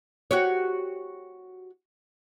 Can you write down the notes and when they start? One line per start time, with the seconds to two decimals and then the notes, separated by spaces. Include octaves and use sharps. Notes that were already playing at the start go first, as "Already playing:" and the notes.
0.31 F#4 G4 C#5